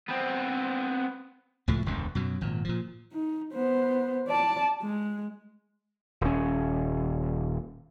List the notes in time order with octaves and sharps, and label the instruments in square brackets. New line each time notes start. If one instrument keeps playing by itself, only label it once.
[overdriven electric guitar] B3 C4
[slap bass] C#2 A2 F3 A3
E1 C#2 F#2 D3
F#2 B2 F#3
G#1 A#2
A#2 F3
[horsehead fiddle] D#4
B3 C5
D5 A5
G#3
[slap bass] D#1 C#4